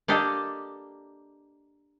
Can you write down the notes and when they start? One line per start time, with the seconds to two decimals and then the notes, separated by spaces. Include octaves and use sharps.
0.08 A#3 D4 G4 A4 D#5